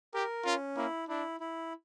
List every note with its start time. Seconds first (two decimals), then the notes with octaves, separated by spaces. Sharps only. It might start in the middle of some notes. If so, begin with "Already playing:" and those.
0.14 G4 A#4
0.45 C#4 F4
0.76 A#3 E4
1.09 D4 E4
1.40 E4